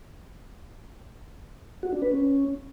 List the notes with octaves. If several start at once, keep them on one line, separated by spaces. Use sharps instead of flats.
F#4
D4
B4
C#4